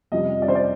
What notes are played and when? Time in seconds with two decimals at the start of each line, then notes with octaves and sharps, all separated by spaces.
0.12 F2 C3 G3 D#5
0.42 D5
0.48 C5
0.55 D5